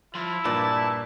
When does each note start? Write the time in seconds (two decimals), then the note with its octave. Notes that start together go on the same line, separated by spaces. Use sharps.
0.15 F3 E4 C6
0.45 G2 A#2 B4 D5 A5